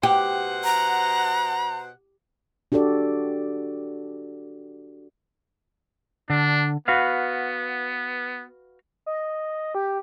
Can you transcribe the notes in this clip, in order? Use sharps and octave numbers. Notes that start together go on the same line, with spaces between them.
B2 G4 C5 F#5
A#5
D4 F#4 G4 A4 D5
D3 D4
B3 F#4 B4 F5
D#5
G4